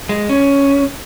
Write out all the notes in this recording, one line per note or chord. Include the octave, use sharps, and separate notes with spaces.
G#3
C#4